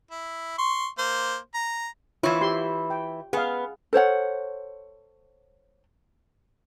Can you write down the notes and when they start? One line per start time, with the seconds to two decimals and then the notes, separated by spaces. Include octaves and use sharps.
0.11 E4
0.58 C6 C#6
0.98 A#3 C5
1.55 A#5
2.23 E3 E4 F4 C#5
2.41 G4 C6
2.90 G5
3.33 B3 G#4 F5
3.93 A4 C5 C#5 F#5